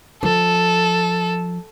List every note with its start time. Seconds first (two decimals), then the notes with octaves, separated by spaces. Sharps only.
0.23 F3 A4